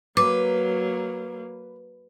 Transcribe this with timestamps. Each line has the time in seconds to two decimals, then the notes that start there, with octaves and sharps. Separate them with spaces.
0.17 F#3 A#3 B4 D6